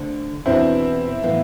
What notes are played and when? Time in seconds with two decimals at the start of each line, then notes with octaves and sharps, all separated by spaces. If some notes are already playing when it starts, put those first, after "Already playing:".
Already playing: D3 A3 C4
0.46 E2 B2 B3 C4 D4 E4
1.22 A2 E3 B3 F4